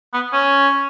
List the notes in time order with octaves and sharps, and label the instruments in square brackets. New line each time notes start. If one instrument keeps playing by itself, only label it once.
[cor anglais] B3
C#4